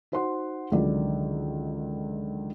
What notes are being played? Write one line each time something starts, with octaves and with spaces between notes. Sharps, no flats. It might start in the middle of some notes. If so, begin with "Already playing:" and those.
D#4 F#4 C5 F#5 C6
C#2 D3 D#3 F#3 D5